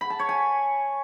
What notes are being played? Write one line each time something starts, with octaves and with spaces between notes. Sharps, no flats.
B5
A5
C#5
G#5